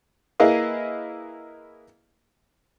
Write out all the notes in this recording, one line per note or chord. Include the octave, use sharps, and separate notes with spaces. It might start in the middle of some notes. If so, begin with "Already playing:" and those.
A#3 E4 G#4 B4 D#5 F5